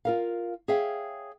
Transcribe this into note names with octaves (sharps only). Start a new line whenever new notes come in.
F4 A#4 F5
G#4 C#5 E5 F5 G5